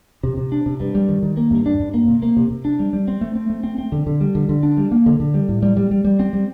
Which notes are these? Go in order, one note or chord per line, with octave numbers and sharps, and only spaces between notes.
C3
C3
D4
C3
G2
G3
D#3
D#3
A#3
G2
D4
G2
A#3
C3
A#3
C3
C3
D4
G3
G3
C4
A3
C4
A3
C4
C4
D3
D3
G3
D3
D3
D4
G3
A#3
D3
D3
G3
A2
G3
G3
G3
G3
C4
G3